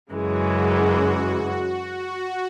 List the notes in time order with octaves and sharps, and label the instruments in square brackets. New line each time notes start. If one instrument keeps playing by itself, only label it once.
[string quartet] F#2 C#3 E3 G#3 [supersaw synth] F#4
[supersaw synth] F#4